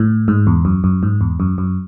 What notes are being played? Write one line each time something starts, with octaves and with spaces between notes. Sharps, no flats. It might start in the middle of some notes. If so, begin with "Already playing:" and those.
Already playing: A2
G#2
E2
F#2
F#2
G#2
E2
F#2
F#2